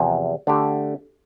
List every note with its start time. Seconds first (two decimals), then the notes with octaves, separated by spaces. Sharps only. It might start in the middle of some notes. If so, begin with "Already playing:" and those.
Already playing: E2 C3 F3
0.47 D3 A3 D4 G4